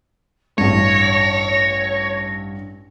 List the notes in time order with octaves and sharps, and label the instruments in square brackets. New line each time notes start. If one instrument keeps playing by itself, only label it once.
[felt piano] A1 G2 [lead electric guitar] C#5 [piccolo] A#6